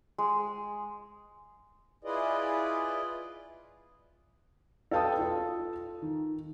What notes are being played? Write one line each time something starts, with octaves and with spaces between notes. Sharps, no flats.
G#3
E4 F4 G#4 B4 D5 D#5
A4 B4 F5 G5 A5 D#6
F4 A4
D#3